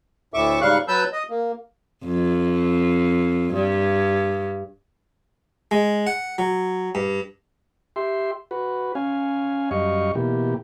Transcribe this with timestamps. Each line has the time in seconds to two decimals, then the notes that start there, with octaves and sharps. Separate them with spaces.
0.34 D2 A2 E5 C#6 D6
0.62 G#2 C#3 G3 F5 C#6 F#6
0.88 F#3 B4 A5 E6 G6
1.13 D#5
1.30 A#3
2.05 F2
3.54 G2
5.71 G#3
6.07 F#5
6.38 F#3
6.95 G2
7.96 G4 E5 C6
8.51 F#4 B4
8.95 C#4 F5 G#5
9.71 F#2 G3 D#5 F5 C#6
10.15 B2 E3 A#3 G4